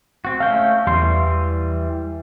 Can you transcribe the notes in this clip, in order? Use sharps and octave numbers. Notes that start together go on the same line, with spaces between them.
C4 F#4
A3 C#4 F5 G6
E2 E3 G3 C6